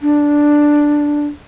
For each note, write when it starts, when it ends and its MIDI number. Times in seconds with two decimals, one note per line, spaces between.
0.01 1.26 62